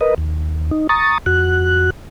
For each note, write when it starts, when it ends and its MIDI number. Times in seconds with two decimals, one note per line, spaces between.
0.01 0.14 70
0.01 0.14 71
0.01 0.14 75
0.18 0.71 39
0.71 0.87 63
0.89 1.18 82
0.89 1.18 85
0.89 1.18 87
0.89 1.18 93
1.26 1.90 41
1.26 1.90 66
1.26 1.90 90